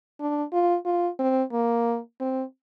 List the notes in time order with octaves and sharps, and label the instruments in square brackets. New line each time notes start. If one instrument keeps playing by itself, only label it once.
[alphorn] D4
F4
F4
C4
A#3
C4